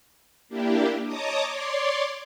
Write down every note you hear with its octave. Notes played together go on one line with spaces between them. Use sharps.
A#3 D4 E4 G4
C#5 D#5 A5 A#5 D6 D#6
C#5 D5 C6 D6